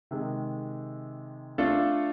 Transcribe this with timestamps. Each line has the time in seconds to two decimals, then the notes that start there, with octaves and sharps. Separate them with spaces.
0.11 C3 D#3 G#3
1.58 A3 D4 F4 A4